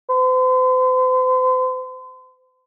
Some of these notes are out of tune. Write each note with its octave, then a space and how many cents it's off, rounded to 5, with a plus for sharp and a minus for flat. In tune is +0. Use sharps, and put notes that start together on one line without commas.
C5 -40